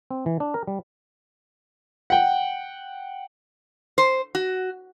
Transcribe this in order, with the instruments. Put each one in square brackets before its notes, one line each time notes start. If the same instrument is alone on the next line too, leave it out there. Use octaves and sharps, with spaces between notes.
[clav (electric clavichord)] C4
E3
D4
A#4
G3
[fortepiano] F#5 G5
[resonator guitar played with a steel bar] C5
F#4